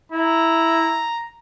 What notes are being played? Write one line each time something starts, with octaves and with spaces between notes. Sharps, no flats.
E4 A#5